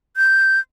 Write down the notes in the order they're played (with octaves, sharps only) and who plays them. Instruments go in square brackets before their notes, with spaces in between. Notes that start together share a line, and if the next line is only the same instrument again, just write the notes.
[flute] G6